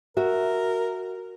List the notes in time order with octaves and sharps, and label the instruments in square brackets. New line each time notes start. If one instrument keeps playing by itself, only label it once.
[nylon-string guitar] F#4 E5 [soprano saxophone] A#4